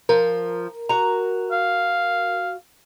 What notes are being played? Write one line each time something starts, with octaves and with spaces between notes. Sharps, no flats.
F3 A#4
F#4 A#5
F5